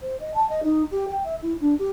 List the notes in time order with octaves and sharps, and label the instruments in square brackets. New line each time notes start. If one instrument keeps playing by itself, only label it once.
[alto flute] C5
D#5
A5
D#5
D#4
G4
G5
E5
E4
D4
G4